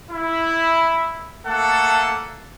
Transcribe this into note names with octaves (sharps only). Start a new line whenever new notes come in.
E4
A3 A#3 A4 F#5